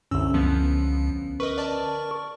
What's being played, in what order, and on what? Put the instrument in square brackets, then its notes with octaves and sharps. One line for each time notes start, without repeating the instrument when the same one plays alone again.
[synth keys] C2 E6 [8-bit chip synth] F#2 [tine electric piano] D3 C#4
[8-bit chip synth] C#2 [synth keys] F3 B3
[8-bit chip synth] A#4 C#6 [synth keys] B4 D#5
[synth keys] D5 A5